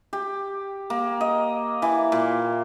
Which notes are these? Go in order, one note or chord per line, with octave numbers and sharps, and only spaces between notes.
G4
A#3
D#5
E3
A#2